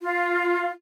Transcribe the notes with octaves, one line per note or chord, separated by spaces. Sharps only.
F4